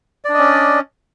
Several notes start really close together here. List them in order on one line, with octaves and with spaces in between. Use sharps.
D5 D4 D#5 C#4